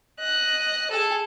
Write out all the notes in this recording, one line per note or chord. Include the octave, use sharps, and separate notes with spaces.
D#5 F#6
G#4 A4